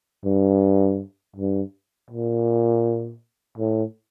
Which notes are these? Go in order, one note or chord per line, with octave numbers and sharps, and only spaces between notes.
G2
G2
A#2
A2